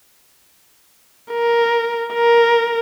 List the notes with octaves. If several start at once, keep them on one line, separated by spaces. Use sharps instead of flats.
A#4
A#4